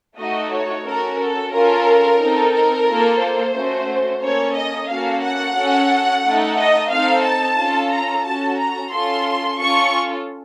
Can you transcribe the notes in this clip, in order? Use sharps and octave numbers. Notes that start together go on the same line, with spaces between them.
A3 D#4 F#4 A4 D#5
C#5
C#4 F#4 A4 A#4
A4
C#4 F4 A4 A#4
C4 D#4 A4
A#4
A#3 F4 A4
C5
A3 C#4 F#4
A#3 C#4 A4 C#5
D#5
A#3 C#4 F#4 A4 F5
F#5
C#4 F#4 A4
A3 D#4 A4
D#5
C4 D#4 A4 F5
A5
C#4 F4 A4
A#5
C#4 F#4 A4 A5
A#5
C#4 F4 A4 C6
C#4 F4 A4 C#6